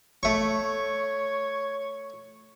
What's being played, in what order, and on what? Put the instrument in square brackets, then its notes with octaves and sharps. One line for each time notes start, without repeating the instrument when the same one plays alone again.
[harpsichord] A3 C#6 [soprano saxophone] C#5